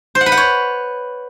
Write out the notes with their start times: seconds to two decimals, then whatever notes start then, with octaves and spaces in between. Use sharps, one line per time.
0.15 C5
0.21 F#5
0.26 B4
0.32 F#5
0.37 C#5